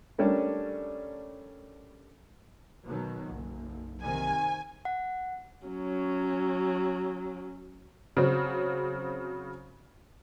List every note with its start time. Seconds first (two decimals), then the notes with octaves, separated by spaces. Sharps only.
0.18 G3 A3 C#4 D4 A#4 D5
2.85 B2 D#3 F#3
3.31 F#1 B1
4.02 C3 D#3 G#5
4.85 F#5
5.66 F#3 C#4
8.17 C#3 F#3 C4